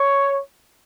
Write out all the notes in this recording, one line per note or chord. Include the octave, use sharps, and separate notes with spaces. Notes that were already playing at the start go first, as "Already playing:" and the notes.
Already playing: C#5